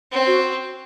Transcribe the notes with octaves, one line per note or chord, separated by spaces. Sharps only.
C4
F#4